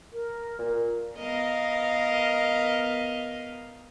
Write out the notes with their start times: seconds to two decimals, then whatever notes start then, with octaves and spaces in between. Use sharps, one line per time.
0.13 A#4
0.59 A#2
1.17 B3 A#4 D#5 F5